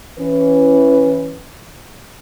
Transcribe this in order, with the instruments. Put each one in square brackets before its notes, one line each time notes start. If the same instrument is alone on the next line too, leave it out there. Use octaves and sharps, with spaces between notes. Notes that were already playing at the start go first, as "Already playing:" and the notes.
[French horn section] E3 C#4 B4